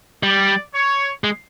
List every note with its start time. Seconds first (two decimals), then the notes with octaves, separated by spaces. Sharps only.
0.23 G3 D5
0.74 C#5
1.24 G#3